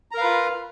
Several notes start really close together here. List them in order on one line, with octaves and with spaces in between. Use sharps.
A#5 A#4 F5 B4 F4